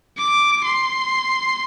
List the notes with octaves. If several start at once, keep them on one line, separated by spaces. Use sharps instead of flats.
D6
C6